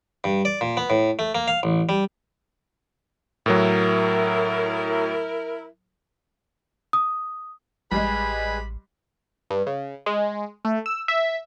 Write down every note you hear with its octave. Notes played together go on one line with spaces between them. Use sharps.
G2
D5
A#2
B3
A2
A3
A#3
F5
A1
G3
A2 F#3 E4 A#4
D#6
A1 G3 G#3 G#4 B4 B5
G2
C#3
G#3
A3
E6
E5